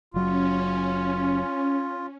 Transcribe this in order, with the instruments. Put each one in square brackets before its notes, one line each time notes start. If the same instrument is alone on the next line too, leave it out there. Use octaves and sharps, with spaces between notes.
[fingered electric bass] F#1 F#3 [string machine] C#4 [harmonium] F4